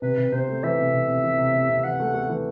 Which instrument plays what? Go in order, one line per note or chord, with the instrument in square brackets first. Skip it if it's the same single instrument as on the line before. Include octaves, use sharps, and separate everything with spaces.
[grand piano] C3 [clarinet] B4
[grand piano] C3
[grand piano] C3 [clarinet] C5
[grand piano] A3
[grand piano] E3 [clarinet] E5
[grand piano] C3
C3
C3
E3
C3
C3
C3
[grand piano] E3 [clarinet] F#5
[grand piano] A3
A3
E3